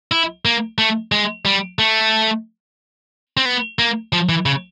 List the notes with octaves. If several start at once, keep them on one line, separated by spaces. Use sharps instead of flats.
E4
A#3
A3
G#3
G3
A3
C4
B3
A#3
F3
E3
C#3